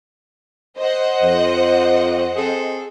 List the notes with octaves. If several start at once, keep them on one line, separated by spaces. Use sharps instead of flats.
C5 D#5 F#5
F2
C4 G#4 A4